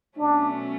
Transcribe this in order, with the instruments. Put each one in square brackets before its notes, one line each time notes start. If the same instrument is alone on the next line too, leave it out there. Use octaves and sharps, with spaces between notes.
[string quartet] B2 F#3 A3 C#4 [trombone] D4